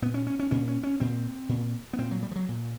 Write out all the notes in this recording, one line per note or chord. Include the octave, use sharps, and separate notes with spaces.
A#2 B3
C#4
C#4
C#4
A#2 C#4
C#4
C#4
A#2 C4
A#2
B3
A#2 C4
F#3
G3
F3
F#3
A#2